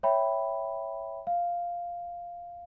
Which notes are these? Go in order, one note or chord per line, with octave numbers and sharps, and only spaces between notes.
C#5 E5 G5 B5
F5